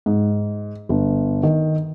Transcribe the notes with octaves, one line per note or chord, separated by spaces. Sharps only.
G#2
G1
D#3